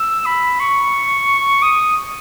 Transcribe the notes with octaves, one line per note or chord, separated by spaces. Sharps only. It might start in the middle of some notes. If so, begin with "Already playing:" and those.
Already playing: E6
B5
C#6
D#6